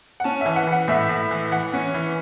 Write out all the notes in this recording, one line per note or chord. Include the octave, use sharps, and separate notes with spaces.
F#5
C#4 A5
E3 E5
F#5
E3
F#5
A2 E5
A2
E3
E3 F#5
C#4
E3